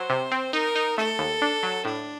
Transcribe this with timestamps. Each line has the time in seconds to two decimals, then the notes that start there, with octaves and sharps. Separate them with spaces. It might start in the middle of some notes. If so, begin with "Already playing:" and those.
Already playing: F#3 C5
0.10 C3
0.31 C4
0.53 D#4 A#4
0.75 D#4
0.97 A3 A4
1.19 D#2
1.42 D4
1.63 F#3
1.85 A2 D4